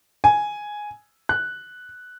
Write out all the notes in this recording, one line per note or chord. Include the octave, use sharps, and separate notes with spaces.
G#5
F#6